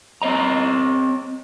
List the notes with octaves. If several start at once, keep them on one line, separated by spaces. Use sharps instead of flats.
C4 C#5 D#5 A#5